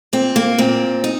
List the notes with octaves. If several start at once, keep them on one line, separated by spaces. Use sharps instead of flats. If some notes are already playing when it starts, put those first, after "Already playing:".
A#2 C4
A#3
A#2 C4
D#4